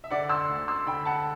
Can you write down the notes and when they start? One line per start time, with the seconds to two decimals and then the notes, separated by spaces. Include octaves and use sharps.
0.04 E5
0.10 D3 D5 F#5
0.29 C6 E6
0.49 D2
0.68 C6 E6
0.86 D3 G5 B5
1.05 F#5 A5